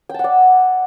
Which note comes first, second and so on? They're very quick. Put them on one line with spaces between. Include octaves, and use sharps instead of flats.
G5 A5 F#5 D5